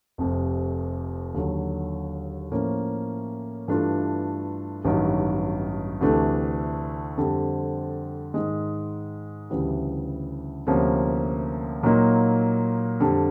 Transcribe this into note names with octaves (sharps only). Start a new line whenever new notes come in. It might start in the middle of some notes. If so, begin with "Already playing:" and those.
F1 F2 C3
D#2 D3 F#3
A2 F3 A#3 C#4
G2 E3 A3 D4 F4
A1 G2 D#3 F#3
D2 C3 E3 A3 D4
F2 D3 G3 C4
G#2 D#3 G#3
D2 C#3 E3 G3
D2 C3 F3 A#3 C#4
A#2 F#3 A#3 D#4
F2 D3 G3